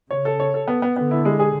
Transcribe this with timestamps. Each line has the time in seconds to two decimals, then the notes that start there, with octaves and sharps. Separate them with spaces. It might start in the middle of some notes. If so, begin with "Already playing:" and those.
0.11 C#3 C#5
0.25 A4
0.40 C#5
0.54 A4
0.67 B3
0.82 B3
0.96 D3 B3
1.11 E4
1.25 G#3
1.39 G#4